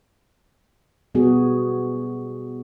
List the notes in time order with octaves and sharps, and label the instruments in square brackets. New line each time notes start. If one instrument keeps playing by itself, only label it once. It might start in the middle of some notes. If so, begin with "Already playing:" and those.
[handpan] B2 G3 B3 F#4 G#4